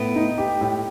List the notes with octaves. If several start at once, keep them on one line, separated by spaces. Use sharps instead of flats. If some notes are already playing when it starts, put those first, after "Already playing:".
Already playing: A2 B3
D#4
G4
A2